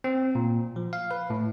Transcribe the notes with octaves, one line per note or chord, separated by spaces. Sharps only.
C4
A#2
F3
F5
B4
A2